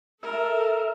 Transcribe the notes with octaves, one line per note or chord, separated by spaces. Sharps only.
A4 A#4 E5